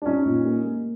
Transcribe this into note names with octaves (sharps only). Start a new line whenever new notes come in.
D4
G3 C#4 D#4
A#2
A#3
A#3